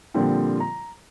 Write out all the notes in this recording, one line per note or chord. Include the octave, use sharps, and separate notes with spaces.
A#2 D3 F3 G3 A#3 C4
A#5